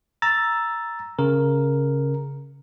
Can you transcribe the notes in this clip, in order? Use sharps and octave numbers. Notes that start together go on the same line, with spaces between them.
A#5 E6 A6
C#3 A#4